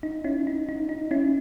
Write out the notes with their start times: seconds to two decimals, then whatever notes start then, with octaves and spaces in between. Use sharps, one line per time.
0.03 D#4
0.24 C#4 E4
0.47 D#4
0.69 D#4
0.89 D#4
1.11 C#4 E4